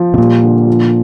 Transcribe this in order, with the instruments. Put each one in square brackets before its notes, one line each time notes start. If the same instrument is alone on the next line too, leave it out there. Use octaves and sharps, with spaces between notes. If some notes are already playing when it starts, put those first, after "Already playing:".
Already playing: [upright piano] F3
[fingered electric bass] C3
[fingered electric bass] A#2 [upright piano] G3
[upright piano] D3
F3